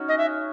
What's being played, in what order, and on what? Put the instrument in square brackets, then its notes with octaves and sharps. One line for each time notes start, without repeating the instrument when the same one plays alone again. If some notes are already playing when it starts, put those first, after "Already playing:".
Already playing: [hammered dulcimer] C#4 D#4 F#4
[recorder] D#5
E5